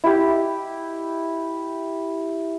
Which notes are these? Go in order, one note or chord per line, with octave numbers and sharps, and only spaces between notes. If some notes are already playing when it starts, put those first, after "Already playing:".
E4 G4